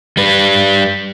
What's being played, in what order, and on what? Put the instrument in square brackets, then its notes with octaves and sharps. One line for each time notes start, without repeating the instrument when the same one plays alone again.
[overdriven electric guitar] G3 B4